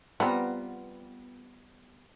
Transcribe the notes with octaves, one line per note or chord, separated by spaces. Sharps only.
F3 G3 B3 C4 F4 A#5